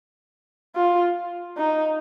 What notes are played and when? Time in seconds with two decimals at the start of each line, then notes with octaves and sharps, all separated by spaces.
0.75 F4
1.57 D#4